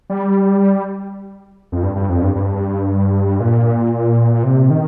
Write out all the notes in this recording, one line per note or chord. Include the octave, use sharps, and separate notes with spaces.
G3
F2
G2
G2
F2
G2
G2
A#2
C3
D#3